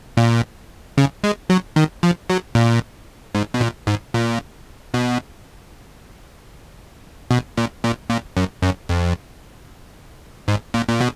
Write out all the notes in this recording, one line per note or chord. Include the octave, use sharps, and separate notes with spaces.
A#2
C#3
G#3
F#3
D#3
F3
F#3
A#2
G#2
B2
A#2
G#2
A#2
B2
B2
A#2
A#2
A#2
F#2
F#2
F2
G#2
A#2
A#2
B2